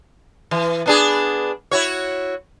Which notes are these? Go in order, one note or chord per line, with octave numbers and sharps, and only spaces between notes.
E3
B3 D4 G#4
E4 F#4 C#5